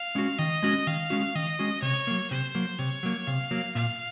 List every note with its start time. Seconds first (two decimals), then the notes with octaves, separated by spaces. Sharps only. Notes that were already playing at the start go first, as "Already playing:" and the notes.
Already playing: F5
0.15 G#3 C#4 F#4
0.38 D#3 D#5
0.63 G#3 C#4 F#4
0.87 D#3 F5
1.10 G#3 C#4 F#4
1.35 D#3 D#5
1.59 G#3 C#4 F#4
1.82 C3 C#5
2.07 F#3 A#3
2.31 C3 C5
2.55 F#3 A#3
2.79 C3 C#5
3.03 F#3 A#3
3.27 C3 F5
3.51 F#3 A#3
3.75 A#2 F5